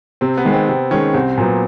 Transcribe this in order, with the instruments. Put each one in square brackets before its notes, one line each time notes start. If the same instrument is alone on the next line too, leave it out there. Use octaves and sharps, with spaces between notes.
[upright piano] C3 [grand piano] C4
[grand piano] B3
[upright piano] D#3 G#3
[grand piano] C4
[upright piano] C3
[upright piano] D#3 G#3 [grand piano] C#4
[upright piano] C2 [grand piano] C4
[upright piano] A#2 F#3 B3